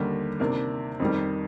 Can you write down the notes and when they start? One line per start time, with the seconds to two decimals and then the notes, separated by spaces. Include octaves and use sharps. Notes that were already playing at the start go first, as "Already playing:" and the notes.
Already playing: D#2 D3 G3 A#3
0.40 C3 D#3 A#3 D4
1.00 F2 D#3 G3